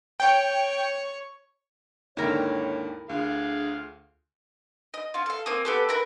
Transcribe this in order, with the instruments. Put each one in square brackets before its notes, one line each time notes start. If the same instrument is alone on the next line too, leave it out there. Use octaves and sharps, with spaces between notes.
[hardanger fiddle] C#5 [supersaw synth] G5
[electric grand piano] D#2 G#2 D3 [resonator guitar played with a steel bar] E4 A#4 G5 [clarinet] C#5
[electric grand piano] D2 [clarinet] D4 [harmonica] F4 G#4 F5
[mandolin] D#5
C#4 F4
A4 F5
A#3 C4 D#6
B3 G4 A4
E4 A#4 B4